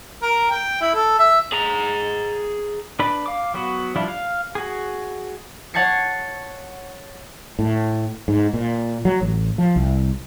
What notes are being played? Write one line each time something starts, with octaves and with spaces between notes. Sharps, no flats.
A#4
G5
E4
A4
E5
G#4 A#5
D4 B4 D5 B5
F5 D6
F#3 B3 F#4
F3 G3 D4 E4 F4
F5
F#4 G#4
C#5 F#5 A5 G#6 C7 C#7
A2
G#2
A#2
F#3
A1
F3
C2